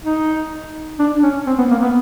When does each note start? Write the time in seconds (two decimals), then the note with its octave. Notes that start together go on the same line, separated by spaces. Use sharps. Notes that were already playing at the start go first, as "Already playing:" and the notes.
0.04 D#4
0.99 D4
1.23 C#4
1.47 C4
1.58 B3
1.71 A#3
1.82 B3